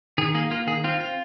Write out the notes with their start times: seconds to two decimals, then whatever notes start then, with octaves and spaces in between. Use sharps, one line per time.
0.18 D#3 G#4
0.35 A#3 G#4
0.51 A#3 F4
0.67 D#3 G#4
0.84 C4 F4
1.00 F4